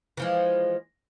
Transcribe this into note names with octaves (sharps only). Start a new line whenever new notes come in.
E3 F3 G#3